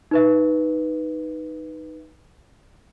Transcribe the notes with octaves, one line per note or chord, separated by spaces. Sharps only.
D#4 B4 E5